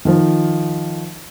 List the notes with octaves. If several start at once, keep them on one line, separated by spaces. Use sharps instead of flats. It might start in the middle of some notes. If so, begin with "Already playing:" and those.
D#3 F3